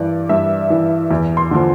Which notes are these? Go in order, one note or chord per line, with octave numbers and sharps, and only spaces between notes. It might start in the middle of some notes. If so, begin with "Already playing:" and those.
Already playing: G2 E3 D5
G2 E5
E3
E2
C6
D3 F3